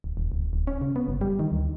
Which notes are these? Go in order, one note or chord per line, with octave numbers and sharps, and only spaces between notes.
D1
D#1
D1
D1
C#4
C#3
B3
G1
G3
D#3
D2